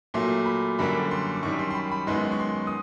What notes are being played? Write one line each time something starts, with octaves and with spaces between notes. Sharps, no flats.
A#2 F#3 A3 C6
B5
F#2 D3 G3 A#3 B5
C6
D6
F#2 D#3 G3 C#6
C6
C6
B5
B5
F#2 D#3 G#3 B3 C6
C#6
C6
D#6